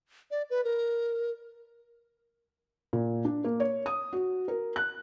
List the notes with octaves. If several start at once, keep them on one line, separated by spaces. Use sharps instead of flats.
D5
B4
A#4
A#2
D4
A#3
C#5
D#6
F#4
A#4
F#6